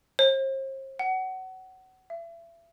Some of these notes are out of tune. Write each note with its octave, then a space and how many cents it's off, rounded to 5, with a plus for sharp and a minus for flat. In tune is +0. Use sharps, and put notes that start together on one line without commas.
C5 +40
F#5 +25
E5 +35